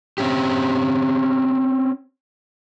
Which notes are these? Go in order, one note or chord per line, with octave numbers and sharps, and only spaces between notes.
C4 C#4 G4